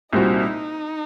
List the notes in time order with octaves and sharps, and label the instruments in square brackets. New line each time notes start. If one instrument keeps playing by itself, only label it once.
[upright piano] C2 A#2 G3 C4 F#4 [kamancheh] D#4